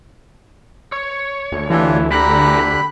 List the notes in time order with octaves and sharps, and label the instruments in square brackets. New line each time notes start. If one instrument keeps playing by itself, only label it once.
[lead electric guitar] C#5
[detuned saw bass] D2
[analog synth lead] E3 [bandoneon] D4 F4 G4
[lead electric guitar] E2 A#5 [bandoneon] D3 G4 F#6 [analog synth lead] B5